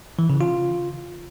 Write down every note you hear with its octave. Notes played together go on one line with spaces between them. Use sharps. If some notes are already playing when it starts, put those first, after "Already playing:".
E3
C#3
F4